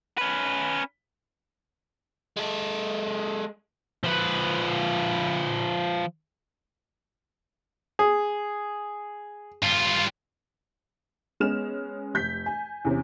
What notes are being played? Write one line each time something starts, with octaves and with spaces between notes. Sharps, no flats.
C#4 B4
G#3 A4
F3 B4
G#4
G2 F4
G#3 B3 C#4 F6 E7
F1 G6 B6
G#5
E2 C3 C#4